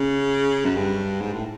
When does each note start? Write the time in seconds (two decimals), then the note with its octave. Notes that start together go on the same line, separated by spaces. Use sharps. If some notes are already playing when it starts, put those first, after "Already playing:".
Already playing: C#3
0.65 F#2
0.76 G2
1.21 G#2
1.33 A2